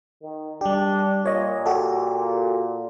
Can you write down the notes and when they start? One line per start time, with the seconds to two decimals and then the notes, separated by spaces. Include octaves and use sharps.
0.22 D#3
0.61 G3 D4 G4
1.26 A#2 C#5 D#5
1.66 F#4 G4 A4